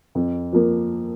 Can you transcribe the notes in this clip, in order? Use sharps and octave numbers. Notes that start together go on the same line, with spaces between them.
F2
F3 A#3